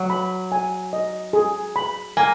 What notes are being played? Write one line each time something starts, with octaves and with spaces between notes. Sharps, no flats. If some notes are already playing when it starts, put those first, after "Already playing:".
Already playing: F#3
B5
G#5
D#5
G#4
B5
A#3 G#5